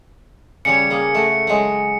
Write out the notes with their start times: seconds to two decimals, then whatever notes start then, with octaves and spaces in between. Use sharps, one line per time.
0.65 C#3 G3 C#5 C#7
0.90 A#3 G#4
1.15 A3 F#4
1.47 F#3 G#3 F#4